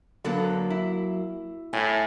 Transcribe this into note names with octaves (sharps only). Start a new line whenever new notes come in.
F#2 D3 F#3 A#3 B3 A4
E4
A2 G#5